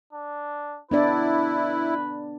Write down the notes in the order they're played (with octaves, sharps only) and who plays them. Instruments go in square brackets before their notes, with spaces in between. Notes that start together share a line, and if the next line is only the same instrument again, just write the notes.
[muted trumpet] D4
[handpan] B3 D4 D5 [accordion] E4 [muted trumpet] B4